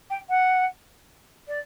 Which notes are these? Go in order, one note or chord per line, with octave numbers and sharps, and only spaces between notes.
G5
F#5
D5